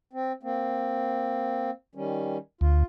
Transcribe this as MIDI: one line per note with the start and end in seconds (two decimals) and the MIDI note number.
0.13 0.32 60
0.43 1.70 58
0.43 1.70 60
1.95 2.37 51
1.95 2.37 55
1.95 2.37 61
2.61 2.84 38
2.61 2.85 65